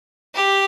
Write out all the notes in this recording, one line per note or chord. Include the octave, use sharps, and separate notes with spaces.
G4